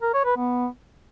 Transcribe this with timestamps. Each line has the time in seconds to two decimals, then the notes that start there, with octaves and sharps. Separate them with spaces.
0.02 A#4
0.14 C#5
0.25 B4
0.37 B3